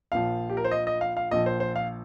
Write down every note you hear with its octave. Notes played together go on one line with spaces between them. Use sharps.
A#1 A#2 F3 F5
G4
A#4
C5
D#5
D#5
F5
F5
A#1 A#2 F3 D#5
C5
C5
F5